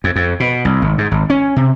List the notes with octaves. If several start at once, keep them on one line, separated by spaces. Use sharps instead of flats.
F2
F2
B2
C2
G#1
G#2
G#1
C#4
C3